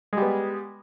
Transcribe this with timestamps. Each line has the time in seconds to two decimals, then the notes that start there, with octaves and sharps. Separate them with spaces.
0.13 G#3
0.17 G3
0.22 B3